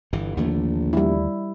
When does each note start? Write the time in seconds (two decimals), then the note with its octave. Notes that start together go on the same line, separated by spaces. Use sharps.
0.13 G1 G2 E3
0.37 A#1 D#2 D3 A3
0.93 G3 E4